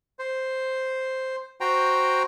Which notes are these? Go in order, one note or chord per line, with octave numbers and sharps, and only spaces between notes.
C5
F#4 C5 G5 A#5